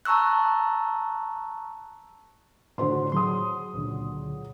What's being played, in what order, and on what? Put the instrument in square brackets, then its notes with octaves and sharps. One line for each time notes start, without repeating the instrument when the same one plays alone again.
[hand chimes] A5 A#5 C#6 E6 F#6
[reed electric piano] A2 D3 [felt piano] F#4 C5 C6
[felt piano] F#3 G#4 D#6 [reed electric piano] C6
[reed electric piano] C#2 A#2 D3